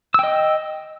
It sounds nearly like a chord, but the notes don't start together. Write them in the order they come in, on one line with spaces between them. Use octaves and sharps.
E6 G5 D#5